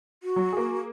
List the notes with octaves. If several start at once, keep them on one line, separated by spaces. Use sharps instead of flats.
F#4
F#3
A#3 G#4